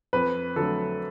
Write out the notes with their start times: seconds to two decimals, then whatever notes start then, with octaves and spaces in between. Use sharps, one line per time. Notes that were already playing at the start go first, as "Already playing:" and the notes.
0.13 F2 B4
0.56 D3 F#3 A3 A4